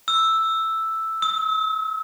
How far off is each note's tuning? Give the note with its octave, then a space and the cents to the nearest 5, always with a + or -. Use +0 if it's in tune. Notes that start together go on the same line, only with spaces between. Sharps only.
E6 +0
E6 -45